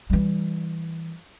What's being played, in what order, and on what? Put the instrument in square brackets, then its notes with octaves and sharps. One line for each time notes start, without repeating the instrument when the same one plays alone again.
[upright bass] E3 G3